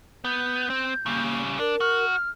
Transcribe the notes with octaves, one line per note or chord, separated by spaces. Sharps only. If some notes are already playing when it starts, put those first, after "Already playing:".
B3 G6
C4
C#3 G3 A#3
D4 A#4
F#4 F6